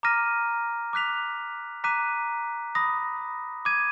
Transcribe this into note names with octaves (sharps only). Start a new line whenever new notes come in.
A#5 D6 F6 A#6 D#7
D6 F#6 B6 F7
A#5 D6 F#6 B6 D#7
B5 D#6 A#6
D6 G#6 D#7